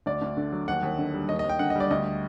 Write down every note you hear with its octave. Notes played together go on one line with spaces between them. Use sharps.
D2 D5
D2
D3
F#3
D#2 F#5
D#2
D3
G3
D#2 D#5
D#5
D#2
G5
D3 F#5
D#5
G3 D5
D2 D#5